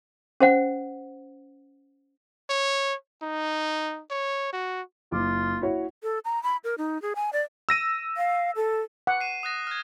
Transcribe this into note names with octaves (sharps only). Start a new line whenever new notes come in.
C#4 C5 F#5
C#5
D#4
C#5
F#4
F#1 F4 D6
E4 F#4 C#5
A4
A#5
B5
A#4
D#4
G#4
G#5
D5
E6 A#6 D#7
F5
A4
F#5
C7 D#7 E7
D#6 F#6 A#6
F6 G#6